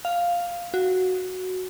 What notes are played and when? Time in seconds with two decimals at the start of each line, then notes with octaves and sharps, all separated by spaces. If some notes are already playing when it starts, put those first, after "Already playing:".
0.05 F5
0.74 F#4